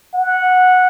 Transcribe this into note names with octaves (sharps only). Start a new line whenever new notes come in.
F#5